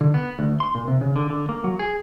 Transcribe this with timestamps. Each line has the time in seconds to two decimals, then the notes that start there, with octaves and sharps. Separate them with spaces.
0.01 D3
0.14 B3
0.39 D2
0.60 C6
0.75 A#2
0.88 C3
1.01 C#3
1.16 D3
1.30 D3
1.49 A#3
1.64 F#3
1.79 G#4